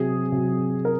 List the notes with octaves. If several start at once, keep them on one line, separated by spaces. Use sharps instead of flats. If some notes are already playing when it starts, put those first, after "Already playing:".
Already playing: C3 F#3 G#4
C3 F#3
A#4